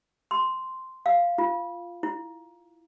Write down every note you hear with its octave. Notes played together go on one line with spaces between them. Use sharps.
C6
F5
F4
E4